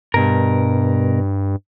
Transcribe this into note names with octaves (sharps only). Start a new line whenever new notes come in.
G2 B2 A#4